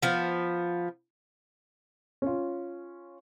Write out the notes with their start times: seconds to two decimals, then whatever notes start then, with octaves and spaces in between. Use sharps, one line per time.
0.02 F3 B3
2.22 C#4 F4